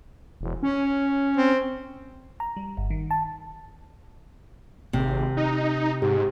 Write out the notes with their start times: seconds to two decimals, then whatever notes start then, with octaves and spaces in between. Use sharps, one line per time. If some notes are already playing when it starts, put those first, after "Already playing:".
0.41 E1
0.63 C#4
1.37 C4
2.40 A#5
2.57 G3
2.77 G1
2.90 D#3
3.11 A5
4.93 G#1 C3
5.37 D#4
6.02 G#2 G4